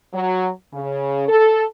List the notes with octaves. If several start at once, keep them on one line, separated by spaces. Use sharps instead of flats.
F#3
C#3
A4